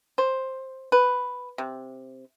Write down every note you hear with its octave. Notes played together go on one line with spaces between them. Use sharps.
C5
B4
C3